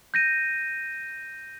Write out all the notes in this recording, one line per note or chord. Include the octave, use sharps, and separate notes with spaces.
G6 A#6 D#7